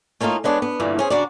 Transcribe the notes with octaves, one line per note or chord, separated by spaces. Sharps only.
A3 A#3 C#4 D#4 F4
G#3 B3 D4 C#5
B3
G2 A#2 D3 E3
C#4 G#4 C5
C#3 D4 F#4 A#4 D5